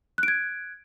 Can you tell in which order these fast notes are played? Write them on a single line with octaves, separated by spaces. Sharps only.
F#6 D7 G#6